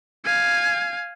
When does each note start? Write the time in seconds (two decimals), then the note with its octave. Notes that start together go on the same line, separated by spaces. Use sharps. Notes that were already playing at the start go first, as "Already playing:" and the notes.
0.24 F5 G#5